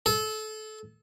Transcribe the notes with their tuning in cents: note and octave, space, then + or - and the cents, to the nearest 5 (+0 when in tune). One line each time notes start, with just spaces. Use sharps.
A4 -25